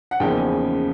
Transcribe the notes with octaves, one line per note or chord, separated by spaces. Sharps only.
F#5
E2 C#3 F3 A#3 D#4 G5
G#5